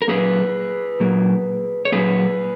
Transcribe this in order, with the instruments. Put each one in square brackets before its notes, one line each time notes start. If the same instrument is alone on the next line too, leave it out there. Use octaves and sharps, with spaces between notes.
[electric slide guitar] A#4
A#2 F#3 A#3 G#4 B4
A#2 F#3 A#3
C#5
A#2 F#3 A#3 G#4 B4